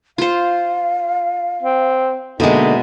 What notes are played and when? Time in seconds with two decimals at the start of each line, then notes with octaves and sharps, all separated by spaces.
0.18 F4 C5 F5
1.63 C4
2.40 B2 D3 G#3 A#3 D#4 E5